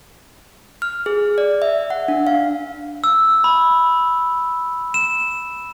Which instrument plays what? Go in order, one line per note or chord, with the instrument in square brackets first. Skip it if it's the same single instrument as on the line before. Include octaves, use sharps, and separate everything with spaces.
[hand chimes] F6
G#4
D5
E5
F#5
D4
F5
[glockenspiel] E6
B5
E7